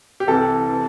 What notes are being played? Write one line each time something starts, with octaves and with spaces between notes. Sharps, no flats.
G4
C2 C3 E3 A4
C3 E3